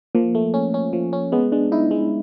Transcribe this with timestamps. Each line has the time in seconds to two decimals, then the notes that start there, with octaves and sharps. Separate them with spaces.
0.15 F3 A#3
0.35 A3
0.54 C#4
0.74 C#4
0.93 F3
1.13 C#4
1.32 G#3 B3
1.52 G#3 D4
1.72 D#4 E4
1.91 G#3